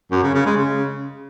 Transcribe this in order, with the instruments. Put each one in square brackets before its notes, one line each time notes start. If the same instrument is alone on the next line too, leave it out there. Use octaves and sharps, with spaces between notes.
[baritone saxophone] F#2
C#3
C#3
G#3
C#3